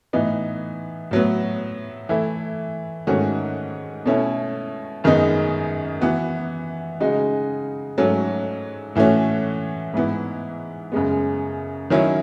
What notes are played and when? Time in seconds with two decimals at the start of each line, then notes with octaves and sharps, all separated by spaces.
0.13 A2 E3 B3 D#4
1.11 A2 F#3 B3
2.09 E3 A3 E4
3.07 G#2 D#3 A3 C#4 F#4
4.06 B2 A3 C#4 E4
5.04 F#2 D#3 G#3 B3 D#4
6.01 E3 B3 F#4
7.00 C#3 G#3 D#4 F#4
7.98 G#2 F#3 A3 C#4
8.95 A2 E3 A3 C#4 F#4
9.94 G#2 E3 B3 E4
10.92 F#2 C#3 G#3 B3
11.90 D#3 F#3 C#4 E4